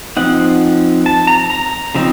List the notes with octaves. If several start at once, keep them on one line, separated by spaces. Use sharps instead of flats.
F3 C4 D#4 F#5
A5
A#5
A#5
C#3 F3 C4 D#4